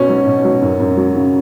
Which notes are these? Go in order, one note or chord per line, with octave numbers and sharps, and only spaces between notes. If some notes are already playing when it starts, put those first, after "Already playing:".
Already playing: B2 C#4
F#3
B2
F#3
F#2
F#2
F#3
C#3